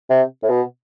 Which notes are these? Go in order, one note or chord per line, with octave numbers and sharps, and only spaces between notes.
C3
A2
B2